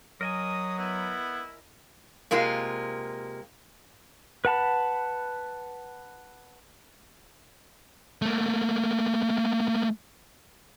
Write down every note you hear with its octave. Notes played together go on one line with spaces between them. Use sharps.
F#3 A#4 D#5 G#5 D#6
B3 E4
C3 G#3 A#3 F4
B4 F#5 A5 B5
A3 A#3